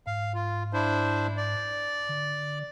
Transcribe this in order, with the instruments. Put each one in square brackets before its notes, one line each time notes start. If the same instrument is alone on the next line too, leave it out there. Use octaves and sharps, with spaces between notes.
[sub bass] G#2 [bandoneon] F5
[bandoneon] F4
D4 E4 C5
D5
[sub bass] D3